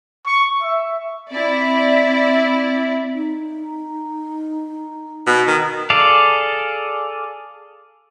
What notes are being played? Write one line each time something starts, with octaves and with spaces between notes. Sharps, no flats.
C#6
E5
C4 E4 D5
D#4
B2
D#3
G#4 A4 D5 F5